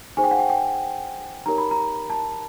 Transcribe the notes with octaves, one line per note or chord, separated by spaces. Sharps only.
D#4 G#4 C5 G#5
G5
F#5
G5
G5
D#4 G4 A#4 C#5 A#5
B5
A#5
A5